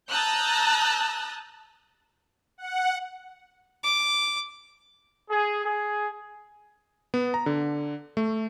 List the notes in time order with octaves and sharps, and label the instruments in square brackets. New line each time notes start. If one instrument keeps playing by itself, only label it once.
[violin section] A5 A#5 D#6 E6 F#6 G6
[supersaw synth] F#5
[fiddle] D6
[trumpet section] G#4
G#4
[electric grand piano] B3
A#5
D3
A3